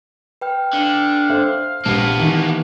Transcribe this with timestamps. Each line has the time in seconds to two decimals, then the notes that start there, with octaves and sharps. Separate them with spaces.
0.41 B4 G5 F6
0.73 D3 F5
1.30 A4 C5 E5
1.86 A#1 A#3 B3 G4 A5
2.19 D#3 E3